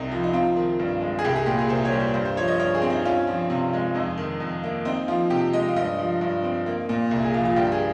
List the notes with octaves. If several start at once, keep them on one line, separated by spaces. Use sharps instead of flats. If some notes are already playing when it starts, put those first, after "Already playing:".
Already playing: C2 C3 C4 D#4
F3
D#4
C4 F4
D#3
G2
G#3
G#4
C2 G4
G#4
A#2 G4
G#4
C2 C5
C#5
G3
C5
G2 C5
C5
F3 C#5
D#5
G2 C#5
G#4
C4
D#4
C#4 F4
F3
C3
G#3
F2 D#4
D#3
F2
A#3
C4 D#4
F3 F4
C3 G4
G#3 D#5
F5
G2 D#5
F3
G2
C4
A#3
A#2
C2
G#4
F3 F4
F4
G2 G4
G#4